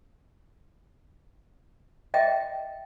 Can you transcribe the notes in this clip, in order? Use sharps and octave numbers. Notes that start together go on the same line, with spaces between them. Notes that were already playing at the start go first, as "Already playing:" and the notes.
D#5 E5 G5